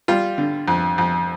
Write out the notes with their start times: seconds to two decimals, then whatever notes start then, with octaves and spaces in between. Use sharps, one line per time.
0.08 G3 F4
0.38 D3
0.68 F2
0.98 F2